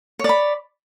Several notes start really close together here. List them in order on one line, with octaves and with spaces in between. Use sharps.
C#5 D5 B5